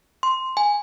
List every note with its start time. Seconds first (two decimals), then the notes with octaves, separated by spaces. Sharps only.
0.23 C6
0.57 G#5